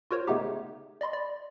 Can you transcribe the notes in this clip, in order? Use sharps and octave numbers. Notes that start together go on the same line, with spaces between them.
F4 F#4 A#4 C5 C#5
C#3 G#3 A3 B3 D#4 G4
D5 D#5 B5 C6
D5